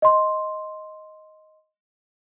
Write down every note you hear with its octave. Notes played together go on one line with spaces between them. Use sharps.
D#5 C6